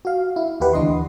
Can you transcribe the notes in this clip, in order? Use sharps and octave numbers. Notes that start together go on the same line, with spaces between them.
F#4 F5
E4
D#2 E4 G4 B4 F#5
D2 E3 D4 D#5 C6